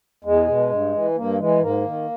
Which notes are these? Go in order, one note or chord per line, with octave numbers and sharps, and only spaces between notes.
E2 G#3
B2
G2
E3
G2 A#3
E3 G#3
G#2 A#3
D#3